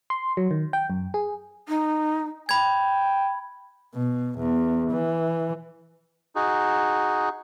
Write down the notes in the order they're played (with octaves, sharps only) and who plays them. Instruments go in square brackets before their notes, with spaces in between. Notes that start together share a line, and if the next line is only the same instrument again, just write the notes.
[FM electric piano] C6
F#3
D#3
G5
F#2
G#4
[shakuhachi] D#4
[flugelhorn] G5 [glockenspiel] B5 G#6
[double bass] B2
E2
E3
[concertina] D#4 F#4 G#4